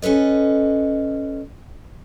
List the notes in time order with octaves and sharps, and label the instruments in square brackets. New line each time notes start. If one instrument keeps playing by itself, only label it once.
[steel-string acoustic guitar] C#4 A4 B4 D#5